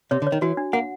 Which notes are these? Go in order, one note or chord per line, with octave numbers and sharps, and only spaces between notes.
C3 C#5
D3
C#5
D#3
E3 F#4
D4
A#3 F#5